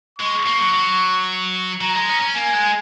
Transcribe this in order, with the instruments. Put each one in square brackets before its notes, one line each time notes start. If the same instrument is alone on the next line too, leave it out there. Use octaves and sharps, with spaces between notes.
[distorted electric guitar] G#3 [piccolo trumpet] C#6
[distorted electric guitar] A#3
F#3
F#3
[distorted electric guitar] F#3 [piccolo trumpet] A#5
[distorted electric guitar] G#3
C#4
C#4
[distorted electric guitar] A#3 [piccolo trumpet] G#5
[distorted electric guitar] G#3